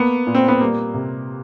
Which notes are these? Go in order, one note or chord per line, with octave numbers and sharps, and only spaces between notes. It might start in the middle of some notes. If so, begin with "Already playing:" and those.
Already playing: A#3 B3
A#2
C4
B3
G3 A#3
C3